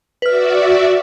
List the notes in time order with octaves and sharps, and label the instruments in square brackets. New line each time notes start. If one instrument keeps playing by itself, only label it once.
[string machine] F#4 D5 E5 [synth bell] B4 F6